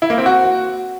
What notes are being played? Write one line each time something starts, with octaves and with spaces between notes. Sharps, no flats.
E4
A#3
C4
F#4